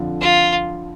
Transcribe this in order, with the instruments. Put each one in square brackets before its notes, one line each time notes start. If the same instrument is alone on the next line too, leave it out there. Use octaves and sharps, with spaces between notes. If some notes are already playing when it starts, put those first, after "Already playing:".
Already playing: [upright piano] F2 D3 F3
[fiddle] F4